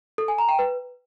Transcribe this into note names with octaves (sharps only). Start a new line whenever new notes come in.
A4
G#5
A#5
G5
B4